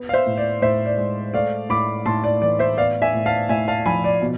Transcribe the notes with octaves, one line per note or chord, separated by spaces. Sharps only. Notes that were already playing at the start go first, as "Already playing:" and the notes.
Already playing: B3
F5
C5 E5
A2
D5
A2 C5 E5
D5
G#3
A3 D5 F5
A2 B5 D6
A2 A5 C6
D5
E3 D5
C5 E5
B3 D5 F5
E5 G#5
A2
F5 A5
A2 E5 G#5
F5 A5
F3 G#5 B5
D5
B2